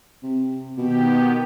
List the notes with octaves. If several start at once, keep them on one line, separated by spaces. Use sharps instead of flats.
C3
B2 D#3 B3 G4